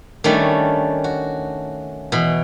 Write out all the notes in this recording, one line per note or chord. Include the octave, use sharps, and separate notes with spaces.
D#3 G3 A3 C#4 D4
F#4
B2 E3